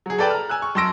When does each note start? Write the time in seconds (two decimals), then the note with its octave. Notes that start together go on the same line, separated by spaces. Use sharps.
0.06 F#3 G#4
0.18 A4 B4 D5 G5 A5
0.30 A#5 F6
0.49 G#5 E6 F#6
0.62 C#6
0.75 F#2 A5 C6 E6 A#6 D7